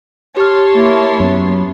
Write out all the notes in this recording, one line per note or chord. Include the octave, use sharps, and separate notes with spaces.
G4 C#5 A5 C6 F6
A#3 E4
F#2 B3